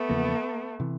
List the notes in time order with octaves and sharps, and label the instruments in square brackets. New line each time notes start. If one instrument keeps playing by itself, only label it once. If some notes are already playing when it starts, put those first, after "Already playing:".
Already playing: [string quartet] A3 B3
[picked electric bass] E2 C#3 F3 A#3
C3 E3